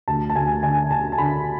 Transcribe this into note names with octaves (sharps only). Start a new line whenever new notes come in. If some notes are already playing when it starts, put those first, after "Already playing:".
D2 A5
A5
D2 G#5
D3 G#5
D3 A5
A5
D3 B5